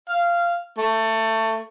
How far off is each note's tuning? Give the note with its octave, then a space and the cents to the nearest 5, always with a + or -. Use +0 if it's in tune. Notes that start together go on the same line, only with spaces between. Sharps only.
F5 -15
A3 +20